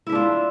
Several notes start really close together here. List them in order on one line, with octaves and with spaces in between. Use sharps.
E4 E5 D4 F4